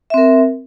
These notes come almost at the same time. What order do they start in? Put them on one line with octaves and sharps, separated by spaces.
E5 C4 A#4